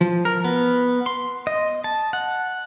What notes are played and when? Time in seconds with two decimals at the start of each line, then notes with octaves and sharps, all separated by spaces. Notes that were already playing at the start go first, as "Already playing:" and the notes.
0.01 F3
0.25 A#4
0.44 B3
1.06 C6
1.47 D#5
1.84 A5
2.13 F#5